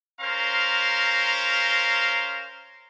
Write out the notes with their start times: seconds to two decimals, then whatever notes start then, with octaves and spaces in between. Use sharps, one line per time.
0.21 C#4 A#4 C5 F5 A#5 C6